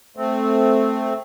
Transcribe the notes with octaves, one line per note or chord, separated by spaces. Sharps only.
A3 C4